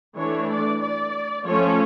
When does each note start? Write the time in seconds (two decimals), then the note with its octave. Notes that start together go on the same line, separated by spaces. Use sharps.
0.16 E3 A3 D4 C#5
0.49 D5
0.81 D5
1.45 F3 A3 C#4 C#5